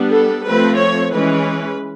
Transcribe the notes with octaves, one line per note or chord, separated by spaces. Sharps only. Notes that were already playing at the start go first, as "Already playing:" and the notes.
Already playing: G3 B3 D4
A4
F3 A3 C4 B4
C#5
E3 G#3 C#4 B4